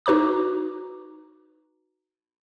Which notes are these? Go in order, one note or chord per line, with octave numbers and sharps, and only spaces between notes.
D#4 F#4 B4 A#5 D6